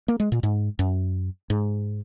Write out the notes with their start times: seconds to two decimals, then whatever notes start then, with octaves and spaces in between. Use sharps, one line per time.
0.08 A#3
0.20 G#3
0.32 A#2
0.43 G#2
0.79 F#2
1.50 G#2